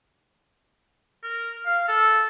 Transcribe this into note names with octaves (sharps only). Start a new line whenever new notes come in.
A#4
F5
A4